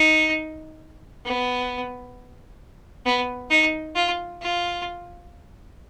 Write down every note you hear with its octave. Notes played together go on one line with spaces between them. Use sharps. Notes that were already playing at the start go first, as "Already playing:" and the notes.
Already playing: D#4
B3
B3
D#4
F4
F4